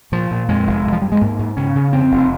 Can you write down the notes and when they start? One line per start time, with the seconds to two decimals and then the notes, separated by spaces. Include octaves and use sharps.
0.12 A#2 F3
0.31 A#2
0.49 F2 G#3
0.67 F1
0.85 G2
0.92 F3
1.02 G2 G3
1.12 G#3
1.21 G#2 A#3
1.39 G#2
1.57 C#3 C#4
1.76 C#3
1.93 F2 C4
2.11 F1